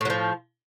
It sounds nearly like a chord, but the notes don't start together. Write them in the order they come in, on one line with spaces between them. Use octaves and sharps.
A2 F#3 F3